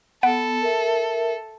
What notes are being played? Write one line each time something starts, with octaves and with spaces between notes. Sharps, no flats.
B3 A4 F#5 B5 D7
A#4 E5